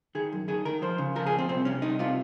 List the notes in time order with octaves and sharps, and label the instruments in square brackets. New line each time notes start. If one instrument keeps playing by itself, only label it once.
[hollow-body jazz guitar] D#3 G#4
F#2
D#3 G#4
D#3 A#4
F3 C5
C#3
F3 A#4
G#4
F2
C4
C2 C4
C3 C#4
C2 D#4
C3 F4